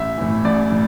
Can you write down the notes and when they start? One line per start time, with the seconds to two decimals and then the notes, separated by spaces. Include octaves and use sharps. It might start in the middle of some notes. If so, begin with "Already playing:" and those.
Already playing: A1 E5
0.17 A2 E3
0.45 A1 D5
0.72 A2